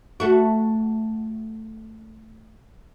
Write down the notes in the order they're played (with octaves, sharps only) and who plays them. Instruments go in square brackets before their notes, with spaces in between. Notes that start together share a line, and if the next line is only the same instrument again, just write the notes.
[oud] A3 F#4